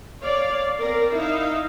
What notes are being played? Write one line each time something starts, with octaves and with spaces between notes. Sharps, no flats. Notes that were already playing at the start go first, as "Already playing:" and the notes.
C#5 D5 F5
C4 A#4 D5 F5
D#4 E4 E5 F5